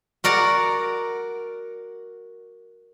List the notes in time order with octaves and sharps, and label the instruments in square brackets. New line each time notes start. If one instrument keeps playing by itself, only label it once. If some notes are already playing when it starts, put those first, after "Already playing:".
[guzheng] F#4 A#4 D5 F#5